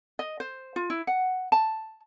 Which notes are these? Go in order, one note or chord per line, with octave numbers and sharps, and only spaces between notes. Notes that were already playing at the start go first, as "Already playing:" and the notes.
D#5
C5
F4
E4
F#5
A5